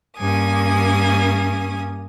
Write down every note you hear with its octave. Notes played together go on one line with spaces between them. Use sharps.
G2 A#3 C#4 G#5 D#6